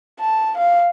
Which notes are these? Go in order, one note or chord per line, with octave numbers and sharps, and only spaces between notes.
A5
F5